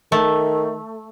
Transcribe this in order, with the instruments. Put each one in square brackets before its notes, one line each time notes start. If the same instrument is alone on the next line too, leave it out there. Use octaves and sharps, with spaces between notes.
[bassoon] D#3 [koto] A3